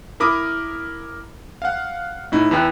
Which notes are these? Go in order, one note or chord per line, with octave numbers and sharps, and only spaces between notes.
E4 A#4 B5 D6 D#6
F5 F#5
A2 D#4 E4
E2 E4 B4 G5 F#6